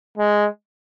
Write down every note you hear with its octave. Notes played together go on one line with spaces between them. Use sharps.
G#3